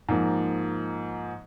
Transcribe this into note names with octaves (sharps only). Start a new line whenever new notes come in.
G#2 F3 A#3